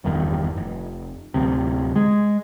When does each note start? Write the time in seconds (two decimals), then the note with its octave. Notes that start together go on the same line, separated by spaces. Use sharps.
0.04 F1 E2 G2 D#3
0.57 F1
1.34 D1 D2 C3
1.96 G#3